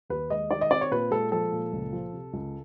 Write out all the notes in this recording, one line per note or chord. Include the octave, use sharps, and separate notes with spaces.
D#2 B4
G#3 D#5
D#3 D5
D#5
C4 D5
C#5
A#2 B4
G#3 A4
F3 A4
A#2
C#2
F3
C3
C#2